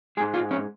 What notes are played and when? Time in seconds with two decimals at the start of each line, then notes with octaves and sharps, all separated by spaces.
0.17 G#3 G#4
0.20 G#2
0.34 F4
0.51 C#4